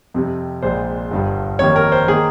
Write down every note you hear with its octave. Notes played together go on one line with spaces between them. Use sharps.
F2 C3 G3
A#1 A#2 G#3 C5
G1 G2 G3
F2 D#3 G3 A#3 C#5
A#4
C5
D#3 A#3 G#4